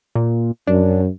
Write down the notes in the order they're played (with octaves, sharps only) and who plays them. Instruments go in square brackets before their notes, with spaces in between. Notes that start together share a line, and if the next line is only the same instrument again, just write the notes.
[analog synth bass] A#2
[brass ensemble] F#2 [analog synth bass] D4